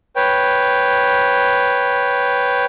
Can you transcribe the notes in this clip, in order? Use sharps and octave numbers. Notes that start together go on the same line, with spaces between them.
B4 C#5 G5